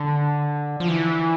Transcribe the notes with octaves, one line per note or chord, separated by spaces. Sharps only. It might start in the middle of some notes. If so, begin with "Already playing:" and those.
Already playing: D3
F3
E3